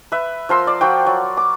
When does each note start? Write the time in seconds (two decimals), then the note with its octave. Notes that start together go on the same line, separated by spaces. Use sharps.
0.12 B4 E5
0.49 F3 A#4 C6 E6
0.67 D5
0.81 F3 F#4 G5
1.07 F#3
1.37 D6